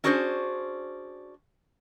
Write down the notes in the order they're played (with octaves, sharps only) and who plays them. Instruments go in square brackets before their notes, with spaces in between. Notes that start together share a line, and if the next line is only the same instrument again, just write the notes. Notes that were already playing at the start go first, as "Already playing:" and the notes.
[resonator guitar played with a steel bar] C#4 D4 F#4 G#4 B4 C5